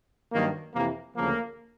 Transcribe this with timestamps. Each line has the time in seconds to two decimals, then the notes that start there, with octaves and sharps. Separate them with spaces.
0.33 G2 D#3 F#3 A#3
0.74 F2 C3 E3 A#3
1.16 D2 C#3 F3 A#3